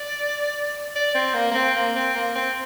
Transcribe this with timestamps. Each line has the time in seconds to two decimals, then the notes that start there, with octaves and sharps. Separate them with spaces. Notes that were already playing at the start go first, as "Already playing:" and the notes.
Already playing: D5
0.95 D5
1.15 C4
1.34 A#3
1.51 A#3
1.55 C4
1.75 A#3
1.96 C4
2.15 A#3
2.35 C4